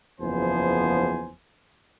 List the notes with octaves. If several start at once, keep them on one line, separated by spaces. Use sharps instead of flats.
F#1 E2 F3 B3 C5 G#5